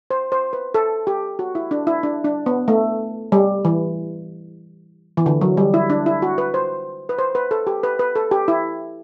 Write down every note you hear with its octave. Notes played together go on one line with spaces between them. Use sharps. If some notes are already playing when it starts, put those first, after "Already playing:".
C5
C5
B4
A4
G4
F#4
E4
D4
E4
D4
D4
B3
A3
G3
E3
E3
D3
F#3
G3
E4
D4
E4
F#4
B4
C5
B4
C5
B4
A4
G4
B4
B4
A4
G4
E4